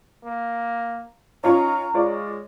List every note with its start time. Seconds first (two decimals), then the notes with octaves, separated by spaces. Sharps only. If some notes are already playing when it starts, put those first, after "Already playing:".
0.24 A#3
1.44 C#4 D#4 F4 C#5 A#5
1.94 G#3 F4 C#5 D5